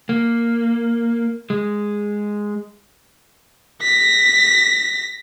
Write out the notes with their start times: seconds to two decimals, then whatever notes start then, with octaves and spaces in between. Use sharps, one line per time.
0.09 A#3
1.50 G#3
3.83 A#6 B6